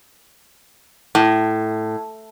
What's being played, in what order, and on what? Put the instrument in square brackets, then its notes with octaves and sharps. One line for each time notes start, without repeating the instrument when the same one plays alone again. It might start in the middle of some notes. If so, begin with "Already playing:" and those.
[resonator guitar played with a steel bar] A2